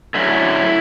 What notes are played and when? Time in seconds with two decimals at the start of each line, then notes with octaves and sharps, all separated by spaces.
0.14 D3 F#3 A3 C#4 E4